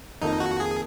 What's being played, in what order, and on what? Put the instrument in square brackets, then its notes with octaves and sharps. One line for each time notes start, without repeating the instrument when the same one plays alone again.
[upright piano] F2 D#3 A#3 [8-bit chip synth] D#4
[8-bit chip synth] F#4
G#4